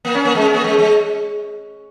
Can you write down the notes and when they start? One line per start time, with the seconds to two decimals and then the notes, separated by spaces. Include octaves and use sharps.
0.05 A#3
0.15 C#4
0.25 A#3
0.35 G#3
0.44 C#4
0.54 A#3
0.64 G#3
0.78 G#3